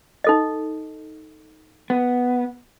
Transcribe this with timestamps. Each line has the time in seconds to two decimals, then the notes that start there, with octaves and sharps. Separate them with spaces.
0.24 D#4 A4 D#5
1.90 B3